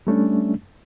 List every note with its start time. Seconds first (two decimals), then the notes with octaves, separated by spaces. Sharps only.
0.07 G3 A3 C#4 D4